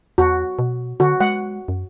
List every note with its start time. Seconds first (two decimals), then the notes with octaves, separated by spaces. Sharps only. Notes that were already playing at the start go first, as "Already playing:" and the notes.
0.18 E2 F#4
0.59 B2
1.00 D3 F#4
1.21 G#3 F#5
1.68 F#2